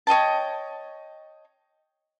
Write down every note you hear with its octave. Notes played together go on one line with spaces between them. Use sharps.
C#5 D#5 G5 A5